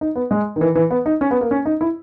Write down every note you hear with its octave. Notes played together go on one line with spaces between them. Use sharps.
D#4
B3
G#3
D#3
E3
E3
B3
D#4
C#4
B3
A#3
C#4
D#4
E4